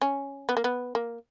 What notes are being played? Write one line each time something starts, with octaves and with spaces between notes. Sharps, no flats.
C#4
B3
A#3
B3
A#3